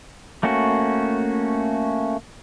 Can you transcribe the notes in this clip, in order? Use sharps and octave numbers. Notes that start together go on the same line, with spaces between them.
A3 A#3 C#4 F#4